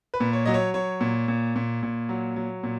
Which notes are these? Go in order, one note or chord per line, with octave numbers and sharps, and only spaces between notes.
B4
A#2
C#5
F#3 D#5
C#5
F#3 C#5
A#2
A#2
A#2
A#2
F#3
F#3
A#2